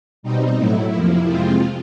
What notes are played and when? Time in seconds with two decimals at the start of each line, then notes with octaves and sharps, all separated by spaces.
0.23 B2 G3 C4 D#4
0.57 A2 F#3 A3 E4
0.92 F2 C3 F3 A#3
1.27 F2 C3 F3 G#3 C4 F4